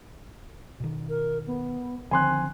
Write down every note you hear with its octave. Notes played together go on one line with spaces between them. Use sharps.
B2 D#3
A#4
B3
D3 D#3 F3 C4 G#5 C6 F#6